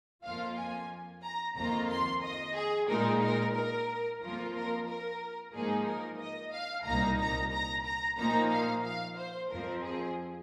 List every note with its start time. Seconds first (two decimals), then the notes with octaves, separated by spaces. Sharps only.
0.24 F2 F3 A#3 F4 F5
0.58 G#5
1.24 A#5
1.56 F2 D#3 A#3 F4 A#5
1.90 C6
2.23 D#5
2.56 G#4
2.88 A#2 G#3 D#4 A#4
3.22 A#4
3.56 A#4
4.21 F2 F3 A#3 F4 A#4
4.54 A#4
4.88 A#4
5.54 G#2 F3 A#3 D#4 G#4
5.86 A#4
6.19 D#5
6.52 F5
6.86 C2 A#2 A#3 D#4 A#5
7.20 A#5
7.52 A#5
7.86 A#5
8.18 A#2 F3 A#3 D#4 A#5
8.51 F5
8.85 F5
9.18 C5
9.50 F2 F3 C4 A#4
9.84 G#4